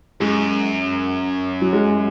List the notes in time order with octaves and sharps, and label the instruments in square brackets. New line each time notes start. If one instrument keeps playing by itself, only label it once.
[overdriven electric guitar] F#2 [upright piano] G#3
[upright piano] F#3
G#3